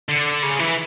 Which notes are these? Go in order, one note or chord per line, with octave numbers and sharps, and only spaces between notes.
D3
C#3
E3